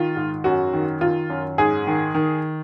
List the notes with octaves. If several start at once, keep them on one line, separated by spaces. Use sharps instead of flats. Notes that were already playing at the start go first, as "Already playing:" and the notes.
Already playing: D#3 F4
G#2
F#2 F#4
D#3
D#3 F4
F#2
G#2 G#4
D#3
D#3